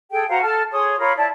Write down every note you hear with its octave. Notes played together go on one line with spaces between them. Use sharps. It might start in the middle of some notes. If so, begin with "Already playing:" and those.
G#4 A4 G5
F#4 C5 F5 A#5
A4 A5 F6
G#4 C#5 C6 D#6
F4 A#4 C#5 B5
E4 D5 A5